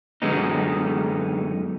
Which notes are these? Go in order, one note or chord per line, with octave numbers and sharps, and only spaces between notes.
F#2 D3 G#3 B3 D#4